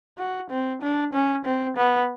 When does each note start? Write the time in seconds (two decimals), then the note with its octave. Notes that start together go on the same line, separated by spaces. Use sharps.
0.18 F#4
0.50 C4
0.82 D4
1.13 C#4
1.45 C4
1.77 B3